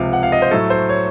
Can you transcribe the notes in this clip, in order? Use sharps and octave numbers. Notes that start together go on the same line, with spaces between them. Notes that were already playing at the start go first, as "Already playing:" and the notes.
Already playing: C#2 C3 F3 F5
F#5
F5
D#5
C5
A2 F#3 A3 A4
C5
C#5